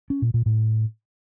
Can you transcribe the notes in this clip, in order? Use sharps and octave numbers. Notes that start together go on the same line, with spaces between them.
C#4
A#2
A#2
A2